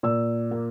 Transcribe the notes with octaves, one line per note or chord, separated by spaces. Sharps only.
A#2 E6
A#3